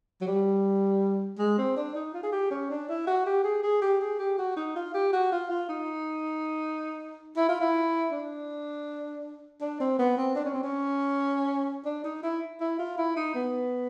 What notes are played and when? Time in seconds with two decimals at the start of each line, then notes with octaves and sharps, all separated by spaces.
0.21 F#3
0.27 G3
1.39 G#3
1.58 C4
1.77 D4
1.95 D#4
2.14 F4
2.23 G#4
2.32 G4
2.51 C#4
2.70 D4
2.89 E4
3.07 F#4
3.26 G4
3.44 G#4
3.63 G#4
3.82 G4
4.01 G#4
4.19 G4
4.38 F#4
4.56 D#4
4.76 F4
4.94 G4
5.13 F#4
5.32 F4
5.50 F4
5.69 D#4
7.37 E4
7.49 F4
7.61 E4
8.12 D4
9.61 D4
9.80 C4
9.99 B3
10.17 C4
10.35 D4
10.45 C#4
10.54 C4
10.63 C#4
11.85 D4
12.04 D#4
12.23 E4
12.61 E4
12.79 F4
12.98 E4
13.17 D#4
13.35 B3